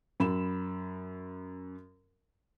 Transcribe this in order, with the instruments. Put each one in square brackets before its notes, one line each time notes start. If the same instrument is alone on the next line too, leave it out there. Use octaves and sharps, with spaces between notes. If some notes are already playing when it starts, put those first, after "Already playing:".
[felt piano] F#2 B5 E7